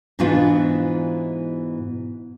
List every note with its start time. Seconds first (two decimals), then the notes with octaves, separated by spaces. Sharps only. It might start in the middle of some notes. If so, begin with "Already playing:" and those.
0.19 G#2 B2 E3 B3 D4 F4